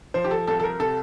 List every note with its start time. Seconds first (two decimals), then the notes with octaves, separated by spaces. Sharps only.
0.14 F3 C5
0.24 G4
0.31 A4
0.47 C2 A4
0.60 A4
0.64 A#4
0.80 C3 A4